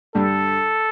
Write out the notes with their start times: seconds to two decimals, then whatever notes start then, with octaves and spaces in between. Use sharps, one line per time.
0.15 G2 D3 G3 D4 A4